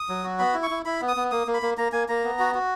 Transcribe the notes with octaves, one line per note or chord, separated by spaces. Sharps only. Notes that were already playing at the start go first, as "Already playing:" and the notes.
Already playing: D#6
F#3
F#4
B3 B5
E4
C#6
E4
E4 B5
B3
D#6
B3
A#3 D#6
A#3
B5
A#3
A#3 A#5
A#3 G#5
A#3 A#5
B3
F#4
F#4